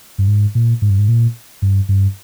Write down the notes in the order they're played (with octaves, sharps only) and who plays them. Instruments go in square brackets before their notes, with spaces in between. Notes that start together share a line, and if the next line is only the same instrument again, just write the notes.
[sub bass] G2
G#2
A#2
G#2
G2
G#2
A#2
G2
G2